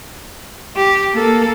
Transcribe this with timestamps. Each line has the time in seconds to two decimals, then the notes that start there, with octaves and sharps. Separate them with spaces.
0.76 G4
1.14 A#3 A4